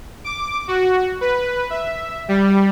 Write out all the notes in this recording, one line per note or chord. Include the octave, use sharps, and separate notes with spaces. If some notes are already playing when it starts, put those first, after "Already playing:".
D6
F#4
B4
E5
G3